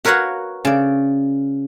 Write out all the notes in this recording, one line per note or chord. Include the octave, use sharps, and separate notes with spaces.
F#4 A#4 B4 C#5 F5 F#5
C#3 D5